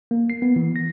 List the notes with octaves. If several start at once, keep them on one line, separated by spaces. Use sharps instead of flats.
A#3
C7
B3
E3
A#6